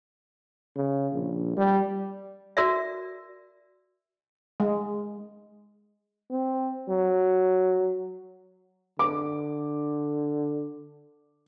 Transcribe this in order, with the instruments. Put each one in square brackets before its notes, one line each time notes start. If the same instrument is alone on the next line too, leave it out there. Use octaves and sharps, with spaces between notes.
[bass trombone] C#3
A#1
G3
[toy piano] F#4 A#4 D5 E5
[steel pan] G#3
[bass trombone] C4
F#3
[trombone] D3 [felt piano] D6